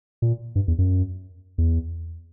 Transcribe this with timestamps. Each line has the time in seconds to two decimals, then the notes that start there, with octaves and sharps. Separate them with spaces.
0.22 A#2
0.55 G2
0.68 E2
0.78 F#2
1.58 E2